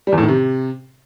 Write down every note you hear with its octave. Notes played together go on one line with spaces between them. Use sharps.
G3
E2
A2
D#3
C3